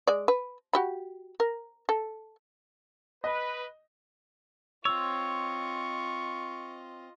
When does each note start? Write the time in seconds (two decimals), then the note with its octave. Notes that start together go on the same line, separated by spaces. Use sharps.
0.07 G#3 D5
0.28 B4
0.73 F#4 G4 B5
1.40 A#4
1.89 A4
3.24 B4 D#5
4.85 C4 F4 C#5 D#5 C#6 E6